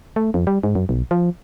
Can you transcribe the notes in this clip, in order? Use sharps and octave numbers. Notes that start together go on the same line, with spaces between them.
A3
F2
G3
G#2
F#2
B1
F3